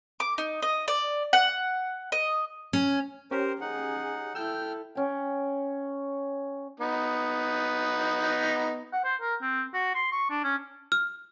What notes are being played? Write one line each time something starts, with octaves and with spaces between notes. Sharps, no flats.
D6
D#4
D#5
D5
F#5
D#5
C#4
C#4 G4 A#4 C5
D#4 G#4 F#5
E4 A4 G5 E6 F6 G6
C#4 G5
B3 D#4
F#5
C5
A#4
C4
F#4
C6
C#6
D4
C#4
F6